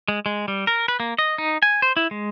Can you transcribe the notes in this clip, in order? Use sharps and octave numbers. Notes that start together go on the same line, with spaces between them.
G#3
G#3
G3
A#4
B4
A#3
D#5
D#4
G#5
C5
E4
G#3